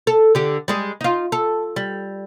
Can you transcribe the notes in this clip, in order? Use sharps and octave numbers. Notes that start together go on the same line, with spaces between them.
A4
D3 G4
G3 G#3 G#4
D#4 F4
A4
G3